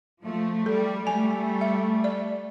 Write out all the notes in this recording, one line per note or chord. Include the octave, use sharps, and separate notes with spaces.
F3 A3
G3 A4
G3 A3 G#5
E5
D5